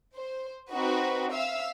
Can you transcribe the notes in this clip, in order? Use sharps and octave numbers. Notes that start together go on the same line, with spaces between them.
C5
C4 D#4 F#4 B4
E5 F5 E6